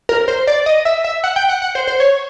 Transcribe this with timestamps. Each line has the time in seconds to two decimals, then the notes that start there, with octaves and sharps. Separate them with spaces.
0.09 A#4
0.28 C5
0.47 D5
0.66 D#5
0.85 E5
1.04 E5
1.24 F#5
1.36 G5
1.49 F#5
1.62 F#5
1.75 C5
1.87 C5
2.00 C#5